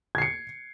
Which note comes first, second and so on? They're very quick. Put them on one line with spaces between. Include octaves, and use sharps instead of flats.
G#6 C7 C#7